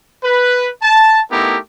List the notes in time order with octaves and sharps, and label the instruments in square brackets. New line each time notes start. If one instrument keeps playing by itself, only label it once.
[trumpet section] B4
A5
A3 B3 D#4 E4 G4 A#4